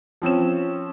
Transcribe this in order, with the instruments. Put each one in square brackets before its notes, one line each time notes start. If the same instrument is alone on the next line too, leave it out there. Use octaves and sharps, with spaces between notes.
[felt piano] F3 C4 C#4 E7